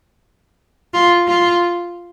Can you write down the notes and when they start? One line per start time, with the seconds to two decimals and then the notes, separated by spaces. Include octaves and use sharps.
0.94 F4
1.27 F4